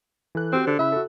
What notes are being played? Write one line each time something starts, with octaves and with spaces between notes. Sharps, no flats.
E3 A4 F#6
C4 F#4 G4 C5
D3
C#3 E4 E5 B5
F#4 A4